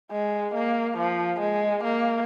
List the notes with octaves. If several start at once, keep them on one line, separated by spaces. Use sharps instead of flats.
G#3
A#3
F3
G#3
A#3